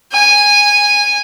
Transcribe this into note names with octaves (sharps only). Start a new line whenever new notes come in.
G#5